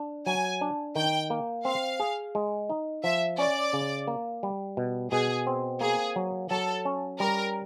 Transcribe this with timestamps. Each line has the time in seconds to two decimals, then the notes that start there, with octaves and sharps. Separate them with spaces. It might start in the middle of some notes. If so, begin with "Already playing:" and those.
Already playing: D4
0.26 F#3 G#5
0.61 D4
0.96 D#3 G5
1.30 A#3
1.65 C4 F5
2.00 G#4
2.35 G#3
2.70 D#4
3.04 F3 E5
3.38 C#4 D5
3.73 C#3
4.07 A#3
4.43 G3
4.77 B2
5.12 B2 G#4
5.47 C4
5.81 A#3 G#4
6.16 F#3
6.50 F#3 A4
6.85 C#4
7.19 G3 A#4